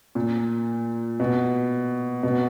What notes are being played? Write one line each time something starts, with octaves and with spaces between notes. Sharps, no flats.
A#2
B2
B2